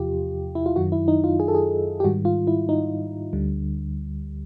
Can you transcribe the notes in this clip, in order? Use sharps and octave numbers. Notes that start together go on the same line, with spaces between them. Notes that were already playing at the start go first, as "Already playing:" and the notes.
Already playing: E2 C3 F3 F4 G4
E4
F4
F#2 D#3 F#3 F#4
E4
D#4
F4
G#4
A4
G#4
G4
G#2 D#3 G3 F#4
F4
E4
D#4
D2 D3 G3